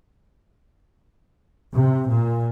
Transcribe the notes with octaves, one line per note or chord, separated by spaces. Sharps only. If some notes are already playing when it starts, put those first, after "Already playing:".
C3
A#2